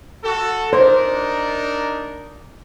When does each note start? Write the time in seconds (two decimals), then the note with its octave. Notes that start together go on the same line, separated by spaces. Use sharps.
0.24 F#4 A4
0.73 D4 D#4 A#4 C5